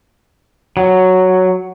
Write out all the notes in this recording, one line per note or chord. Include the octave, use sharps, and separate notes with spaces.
F#3